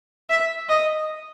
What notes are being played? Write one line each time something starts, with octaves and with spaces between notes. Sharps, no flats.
E5
D#5